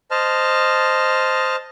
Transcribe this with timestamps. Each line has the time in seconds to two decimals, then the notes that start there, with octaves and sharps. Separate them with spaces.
0.11 C5 D#5 A5 F6